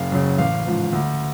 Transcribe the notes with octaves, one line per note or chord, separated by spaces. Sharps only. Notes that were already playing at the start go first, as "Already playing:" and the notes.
Already playing: F#1 F5
F#2 C#3
A1 F5
G#2 F3
D2